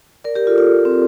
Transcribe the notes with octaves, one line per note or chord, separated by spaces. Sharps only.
A#4 D5
G4 A#4
F4 A4
F4
C4